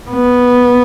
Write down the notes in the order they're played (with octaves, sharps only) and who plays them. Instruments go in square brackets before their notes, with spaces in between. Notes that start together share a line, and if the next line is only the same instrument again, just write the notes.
[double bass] B3